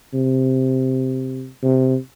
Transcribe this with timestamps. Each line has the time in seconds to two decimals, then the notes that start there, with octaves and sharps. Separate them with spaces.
0.14 C3
1.62 C3